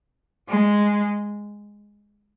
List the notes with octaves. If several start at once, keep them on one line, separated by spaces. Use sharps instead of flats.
G#3